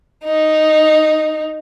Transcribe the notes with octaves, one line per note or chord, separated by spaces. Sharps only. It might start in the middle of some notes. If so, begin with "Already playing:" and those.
D#4